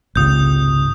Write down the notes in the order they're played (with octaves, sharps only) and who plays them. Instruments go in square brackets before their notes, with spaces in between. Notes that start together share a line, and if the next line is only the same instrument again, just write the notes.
[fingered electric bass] G#1 C#2 C3 [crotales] D#6 G6